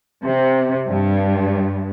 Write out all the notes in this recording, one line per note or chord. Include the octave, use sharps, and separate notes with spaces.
C3
G2